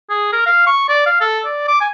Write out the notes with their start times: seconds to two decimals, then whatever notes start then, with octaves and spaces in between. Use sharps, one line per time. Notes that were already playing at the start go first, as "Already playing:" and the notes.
0.09 G#4
0.32 A#4
0.46 F5
0.66 C#6
0.89 D5
1.06 F5
1.20 A4
1.45 D5
1.68 D6
1.80 G#5